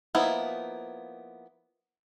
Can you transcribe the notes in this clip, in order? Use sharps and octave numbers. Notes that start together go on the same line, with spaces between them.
F3 A#3 B3 D#4 E4